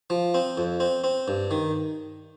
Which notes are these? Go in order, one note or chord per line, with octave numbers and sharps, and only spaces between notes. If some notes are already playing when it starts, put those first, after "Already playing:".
F3
C4
F2
C4
C4
G2
D#3